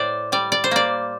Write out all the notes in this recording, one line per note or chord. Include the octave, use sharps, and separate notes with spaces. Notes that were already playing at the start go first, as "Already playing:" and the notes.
Already playing: A2 C5 D5
G3 D5
D5
C5
A#3 D5